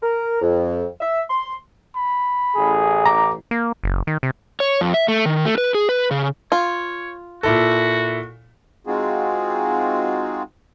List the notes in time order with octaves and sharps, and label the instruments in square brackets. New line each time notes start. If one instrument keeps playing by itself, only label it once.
[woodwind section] A#4
F2
E5
C6
[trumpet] B5
[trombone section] A1 [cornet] G#4
[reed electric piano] A#5 [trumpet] D6
[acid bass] A#3
F#1
D#3
C3
[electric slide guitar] C#5
F2
E5
A3
D#3
A3
B4
G#4
B4
C#3
[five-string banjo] F4 [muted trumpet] C#5
[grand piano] A#2 E4 A4 [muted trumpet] F#4
[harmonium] G#3 C4 D#4 F4 F#4 G#4